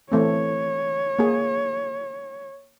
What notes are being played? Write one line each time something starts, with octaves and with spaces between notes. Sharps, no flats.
E3 A3 C4 C#5
A#3 G#4